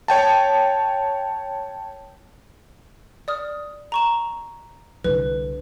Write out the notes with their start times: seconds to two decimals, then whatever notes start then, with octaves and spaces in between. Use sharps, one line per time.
0.08 C#5 G5 A5
3.28 D5 D#6 F6
3.92 A#5 C#6 E7
5.04 C2 D3 B4